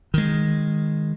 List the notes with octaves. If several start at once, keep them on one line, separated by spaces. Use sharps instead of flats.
D#3 G#3